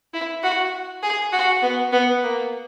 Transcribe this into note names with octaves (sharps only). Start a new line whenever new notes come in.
E4
F#4
G#4
F#4
B3
B3
A#3